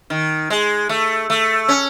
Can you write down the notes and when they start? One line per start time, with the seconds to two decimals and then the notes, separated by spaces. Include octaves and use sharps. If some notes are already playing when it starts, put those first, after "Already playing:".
0.10 D#3
0.50 G#3
0.89 A3
1.30 A3
1.68 C#4